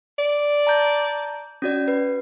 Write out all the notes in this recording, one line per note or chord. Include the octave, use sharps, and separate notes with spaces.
D5
A5 A#5 G6
C#4 F#4 D5
B4